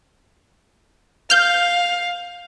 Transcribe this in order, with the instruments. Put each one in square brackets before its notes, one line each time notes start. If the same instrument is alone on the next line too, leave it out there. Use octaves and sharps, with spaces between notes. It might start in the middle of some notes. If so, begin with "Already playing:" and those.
[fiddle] F5 [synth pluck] F6 G6